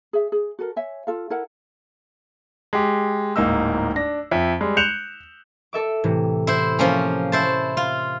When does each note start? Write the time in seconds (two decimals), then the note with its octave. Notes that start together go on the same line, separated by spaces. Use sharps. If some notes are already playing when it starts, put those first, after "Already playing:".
0.13 G#4 E5
0.32 G#4
0.59 F#4 A4 A#4
0.76 C#5 E5 G#5
1.07 F4 A4 F5
1.30 E4 A4 A#4 F#5
2.73 G#3 G4
3.36 D1 G#2 A#3 D#4 E6
3.96 D4 A#6
4.31 F2 E5
4.61 G3 G#3
4.77 F#6 G6 C#7 E7 F7
5.73 A4 E5 D6
6.04 A2 C3 E3
6.47 E4 C5
6.79 F3 A#3 C#4
7.32 E4 C5 A5
7.77 F4